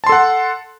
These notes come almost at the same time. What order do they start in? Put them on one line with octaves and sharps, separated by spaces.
A5 C6 A4 F#5